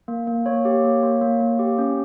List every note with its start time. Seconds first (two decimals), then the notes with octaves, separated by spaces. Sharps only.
0.08 A#3
0.27 A#3
0.46 A#3 C#5
0.65 G4
0.84 A#3
1.03 A#3
1.22 A#3
1.41 A#3
1.59 G4
1.78 C#4